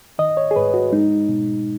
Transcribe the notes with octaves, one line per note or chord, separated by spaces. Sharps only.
D#3 D#5
C#5
G#4
G#2 B4
F#4
G#3 D#4
B2